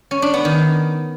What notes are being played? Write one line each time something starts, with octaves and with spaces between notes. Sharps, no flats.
C#4
D4
B3
D#3